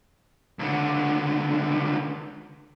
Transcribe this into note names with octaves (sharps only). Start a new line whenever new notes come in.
C#2 D3